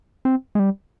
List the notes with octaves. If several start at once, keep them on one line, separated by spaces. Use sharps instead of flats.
C4
G#3
G3